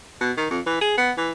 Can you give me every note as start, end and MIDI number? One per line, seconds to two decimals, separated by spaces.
0.21 0.32 47
0.37 0.48 51
0.51 0.60 41
0.67 0.81 52
0.81 0.97 68
0.98 1.12 59
1.18 1.32 52